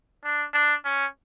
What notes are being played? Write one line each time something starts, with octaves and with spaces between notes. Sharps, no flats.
D4
D4
C#4